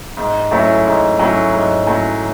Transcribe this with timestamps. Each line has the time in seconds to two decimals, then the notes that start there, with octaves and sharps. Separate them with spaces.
0.17 G#2
0.51 F#3 A3 C#4 E4
0.86 G#2
1.19 F#3 A3 C#4 E4
1.53 G#2
1.87 F#3 A3 C#4 E4